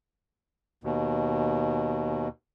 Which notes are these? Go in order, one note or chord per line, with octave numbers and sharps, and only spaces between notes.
D#2 B2